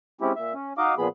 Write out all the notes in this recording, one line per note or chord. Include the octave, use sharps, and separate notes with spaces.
G#3 C4 C#4 E4 G4
A#2 E5
C#4
D#4 F#4 D#5 F5 D6
A#2 F3 B3 G#4 B5